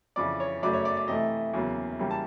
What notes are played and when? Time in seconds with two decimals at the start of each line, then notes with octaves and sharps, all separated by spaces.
0.16 F2 C#3 E3 D5
0.40 C#5
0.62 F#2 C#3 F#3 A3 D5
0.74 C#5
0.85 D5
0.97 D5
1.08 C3 E3 A3 D#5
1.53 E2 C#3 F#3 A#3
1.99 C#3 E3 G3 A#3
2.11 A5